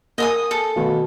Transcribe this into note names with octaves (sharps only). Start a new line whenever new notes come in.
A#3 A#4 D#5 G#5 D#6
A4
B2 D#3 A3